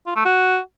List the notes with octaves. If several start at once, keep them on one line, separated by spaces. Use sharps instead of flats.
F4
A3
F#4